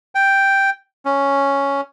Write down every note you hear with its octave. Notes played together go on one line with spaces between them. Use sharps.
G5
C#4